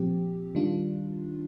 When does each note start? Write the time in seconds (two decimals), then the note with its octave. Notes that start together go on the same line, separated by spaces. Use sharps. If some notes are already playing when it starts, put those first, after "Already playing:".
Already playing: A#2 F3 C4 G4
0.55 D#3 G3 D4 F4